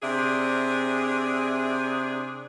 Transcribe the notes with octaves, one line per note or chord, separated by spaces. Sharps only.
C3 D4 G#4 E5